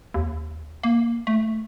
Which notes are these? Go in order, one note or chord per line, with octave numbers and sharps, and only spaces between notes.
D#2
A#3
A3